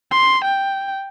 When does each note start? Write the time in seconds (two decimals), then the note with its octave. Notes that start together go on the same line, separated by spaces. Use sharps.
0.12 C6
0.45 G5